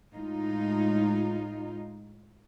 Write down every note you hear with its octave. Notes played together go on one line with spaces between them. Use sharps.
A2 G#3 D#4 F4